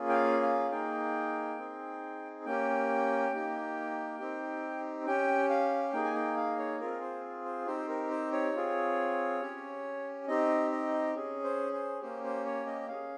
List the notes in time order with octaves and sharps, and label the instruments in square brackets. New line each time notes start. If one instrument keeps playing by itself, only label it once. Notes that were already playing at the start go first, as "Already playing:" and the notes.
Already playing: [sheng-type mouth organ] A#3 C#4 F4 G#4
G5
F5
F5
A#3 D#4 G#4 G5
C4 D#4 G#4
A#3 C#4 G4 G5
A#3 D#4 G4
C4 D#4 G4
C#4 G4 G5
F5
A#3 D#4 G#4 G5
G#5
G5
F5
C#5
C4 F4 G#4 A#4
C5
C5
C4 D#4 G4 C5
A#4
C5
C#5
C4 F4 G#4
C#4 G4
C4 D#4 G4 D#5
D#5
C#4 G#4
C5
C5
A#3 C#4 G4 C5
C5
C#5
D#5
C#4 G#4 F5